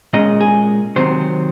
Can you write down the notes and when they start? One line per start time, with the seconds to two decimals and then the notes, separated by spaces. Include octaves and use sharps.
0.13 A#2 G#3 C#4 D#5
0.41 G#4
0.96 C3 D#3 F#3 C4 C5